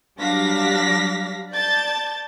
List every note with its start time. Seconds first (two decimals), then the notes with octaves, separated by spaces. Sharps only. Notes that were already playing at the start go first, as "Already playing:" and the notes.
0.18 F#3 G3 D4 F5 A#6 B6
1.51 D5 A5 G6 A6